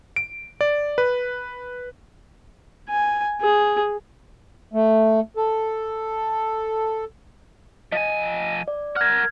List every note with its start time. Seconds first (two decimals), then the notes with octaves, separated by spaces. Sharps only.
0.16 D7
0.61 D5
0.98 B4
2.89 G#5
3.41 G#4
4.74 A3
5.37 A4
7.92 F3 D#5 G#5
8.68 D5
8.96 A#4 F#5 F6 G#6